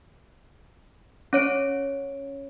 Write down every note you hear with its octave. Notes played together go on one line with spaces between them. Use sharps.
C#4 C#5 D7